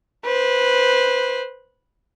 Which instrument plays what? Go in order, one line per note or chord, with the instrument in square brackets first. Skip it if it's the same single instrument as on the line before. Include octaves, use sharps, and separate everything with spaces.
[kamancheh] B4 C5